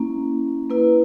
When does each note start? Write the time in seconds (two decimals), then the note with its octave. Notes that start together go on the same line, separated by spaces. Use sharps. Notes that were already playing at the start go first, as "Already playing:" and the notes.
Already playing: A#3 C#4 E4
0.70 A#3 E4 B4